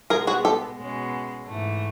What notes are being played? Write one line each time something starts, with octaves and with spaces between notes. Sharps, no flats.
B2 G#3 B3 G#4 A#4
F#4 G#4
G4 A4
B2 G#3 C#4
G#2 E3 A3